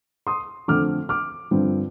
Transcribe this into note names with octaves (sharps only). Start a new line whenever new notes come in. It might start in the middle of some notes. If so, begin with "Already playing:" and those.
C6 D#6
F2 D3 A3 C4 D6 F6
D6 F6
G2 D3 F3 C4